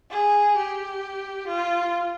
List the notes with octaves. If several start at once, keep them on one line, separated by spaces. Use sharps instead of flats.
G#4
G4
F4